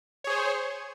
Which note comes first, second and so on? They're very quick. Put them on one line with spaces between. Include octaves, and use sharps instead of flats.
C#5 G#4 C5